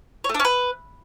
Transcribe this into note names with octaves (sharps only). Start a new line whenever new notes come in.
C#5
A3
D4
C#4
B4